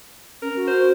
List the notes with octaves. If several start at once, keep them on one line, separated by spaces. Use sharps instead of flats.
C#4 A#4
F#4
C5